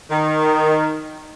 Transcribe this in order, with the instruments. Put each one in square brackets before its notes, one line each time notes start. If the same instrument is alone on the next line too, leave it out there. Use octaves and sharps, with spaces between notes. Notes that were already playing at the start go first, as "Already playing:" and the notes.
[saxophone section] D#3